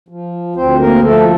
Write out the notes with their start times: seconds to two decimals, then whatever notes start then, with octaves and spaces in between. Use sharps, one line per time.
0.08 F3
0.55 D2 C4 C5
0.79 A#3 A#4
1.03 F3 A3 A4